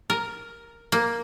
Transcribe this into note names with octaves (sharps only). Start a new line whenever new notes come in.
A#4
A#3